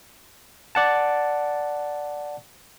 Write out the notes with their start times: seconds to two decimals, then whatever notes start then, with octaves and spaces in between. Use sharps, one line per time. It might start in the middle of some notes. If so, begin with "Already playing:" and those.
0.75 D5 F#5 A5